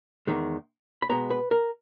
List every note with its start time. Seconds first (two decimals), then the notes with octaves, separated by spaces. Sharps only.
0.27 E2 D#3 G#3
1.02 B5
1.09 B2 G#3 B3 A#5
1.30 B4
1.51 A#4